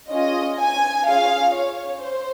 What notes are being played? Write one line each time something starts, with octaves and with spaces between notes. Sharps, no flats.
C#4 F4 G#4 D#5
G#5
C#4 F4 G#4 F5
C#5
C5